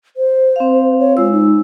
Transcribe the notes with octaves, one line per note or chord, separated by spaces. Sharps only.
C5
C4 F5
C#5
G#3 F4 E6
D#4